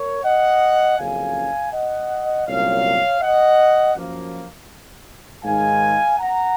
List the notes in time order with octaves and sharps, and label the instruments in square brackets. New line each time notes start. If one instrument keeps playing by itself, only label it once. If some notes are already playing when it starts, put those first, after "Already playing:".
Already playing: [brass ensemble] A#4 C#5
D#5 F#5
F#1 F2 C#3 F5 G#5
D#5 F#5
C2 A#2 F#3 C#4 C#5 F5
D#5 F#5
F#2 F3 A#3
G#2 D#3 G#3 F5 G#5
F#5 A#5